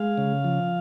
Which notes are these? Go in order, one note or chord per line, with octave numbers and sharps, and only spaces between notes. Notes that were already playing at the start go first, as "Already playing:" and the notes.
Already playing: G#3 F5
C#3
F3